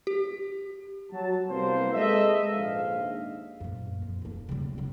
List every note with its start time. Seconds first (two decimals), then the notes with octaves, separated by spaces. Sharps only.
0.07 G4
1.11 F#3 A5
1.49 C2 A#3 B3 A#4 C5
1.93 G#3 A4 B4 D#5 E5
2.53 A#1 D#2 G#2 F5
3.60 F#2 A#2
4.02 F2
4.22 E1 A#3
4.49 C#3 G3
4.60 D1
4.78 D#3 F#3